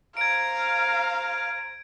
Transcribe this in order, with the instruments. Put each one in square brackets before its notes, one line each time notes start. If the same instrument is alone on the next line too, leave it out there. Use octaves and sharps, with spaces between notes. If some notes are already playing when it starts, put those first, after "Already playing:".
[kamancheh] C5 A#5 [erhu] F5 [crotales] G#6 D7